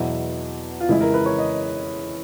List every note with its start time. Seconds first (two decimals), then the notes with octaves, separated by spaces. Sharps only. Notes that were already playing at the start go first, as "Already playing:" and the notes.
Already playing: E2 B2 F#3 E4
0.80 F4
0.89 F2 C#3 E3 G#3 E4
1.01 A#4
1.14 B4
1.26 C#5
1.38 D#5